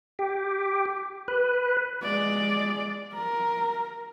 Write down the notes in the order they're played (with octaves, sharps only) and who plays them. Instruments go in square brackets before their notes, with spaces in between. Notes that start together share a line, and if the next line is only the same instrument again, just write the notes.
[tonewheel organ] G4
B4
[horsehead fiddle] G#3 D5
A#4